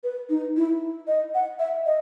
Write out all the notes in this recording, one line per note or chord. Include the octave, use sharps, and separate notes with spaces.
B4
D#4
E4
D#5
F#5
E5
D#5